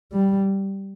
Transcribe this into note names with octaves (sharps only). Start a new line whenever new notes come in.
G3